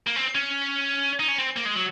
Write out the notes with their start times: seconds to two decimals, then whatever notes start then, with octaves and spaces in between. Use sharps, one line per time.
0.07 A#3
0.16 C4
0.35 C#4
1.20 D#4
1.28 C#4
1.38 C4
1.57 A#3
1.66 G#3
1.75 F#3